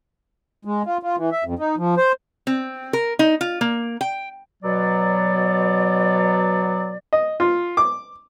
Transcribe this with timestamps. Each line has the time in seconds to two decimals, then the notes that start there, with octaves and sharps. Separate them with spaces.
0.65 G#3
0.86 F4
1.03 F4
1.17 E3
1.32 E5
1.44 F2
1.59 D#4
1.77 F3
1.97 C5
2.47 C4
2.93 A#4
3.19 D#4
3.41 F4
3.61 A#3
4.01 G5
4.63 B2 F#3 D5
7.13 D#5
7.40 F4
7.77 D6